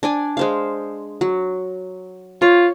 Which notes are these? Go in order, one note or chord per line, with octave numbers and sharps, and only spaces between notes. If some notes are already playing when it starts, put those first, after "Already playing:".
D4 D5 G#5
G#3 C5 F5
F#3
F4 C#5